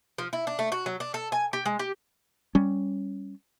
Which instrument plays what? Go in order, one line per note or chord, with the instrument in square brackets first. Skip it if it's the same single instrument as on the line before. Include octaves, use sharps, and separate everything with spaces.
[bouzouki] F3
E4
D4
A3
F#4
F#3
D4
A4
G#5
G4
G#3
G4
[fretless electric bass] G3 C#4